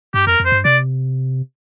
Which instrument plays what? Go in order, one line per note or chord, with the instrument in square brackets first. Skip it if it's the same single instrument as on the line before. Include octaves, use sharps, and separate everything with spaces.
[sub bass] G2 [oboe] G4
[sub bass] F2 [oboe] A#4
[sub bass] F2
[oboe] C5
[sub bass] G2
[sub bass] C3 [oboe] D5